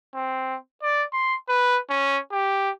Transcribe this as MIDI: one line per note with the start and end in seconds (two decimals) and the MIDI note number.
0.15 0.56 60
0.83 1.04 74
1.13 1.35 84
1.48 1.78 71
1.90 2.18 61
2.32 2.71 67